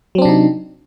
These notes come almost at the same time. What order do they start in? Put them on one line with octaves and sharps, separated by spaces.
F#3 C4 D4 C3 D#4